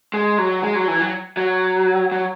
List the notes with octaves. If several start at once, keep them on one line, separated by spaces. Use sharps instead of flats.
G#3
F#3
G#3
F#3
E3
F#3
F#3
F#3